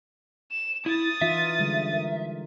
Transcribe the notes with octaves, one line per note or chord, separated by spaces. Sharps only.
E7
E4 D#6 A6
E3 D#4 F4 E5
D3 G3 G#3
A#4